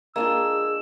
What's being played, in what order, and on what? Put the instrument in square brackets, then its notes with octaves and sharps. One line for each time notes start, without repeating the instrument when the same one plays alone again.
[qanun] G#3 D4 F4 [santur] A#3 [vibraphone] G#4 [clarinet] E6